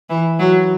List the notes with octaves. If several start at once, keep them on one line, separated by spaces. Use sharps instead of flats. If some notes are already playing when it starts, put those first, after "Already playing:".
E3
F#3